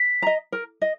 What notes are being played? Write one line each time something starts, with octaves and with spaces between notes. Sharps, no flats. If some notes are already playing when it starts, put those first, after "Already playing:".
Already playing: B6
D#5 A#5
A#4
D#5